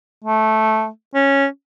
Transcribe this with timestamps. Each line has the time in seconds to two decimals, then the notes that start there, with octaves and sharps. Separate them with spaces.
0.24 A3
1.14 C#4